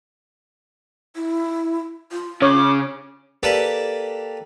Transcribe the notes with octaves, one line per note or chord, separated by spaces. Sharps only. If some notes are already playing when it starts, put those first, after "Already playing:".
E4
F4
C#3 C#5 D6
A#3 G4 A4 B4 D5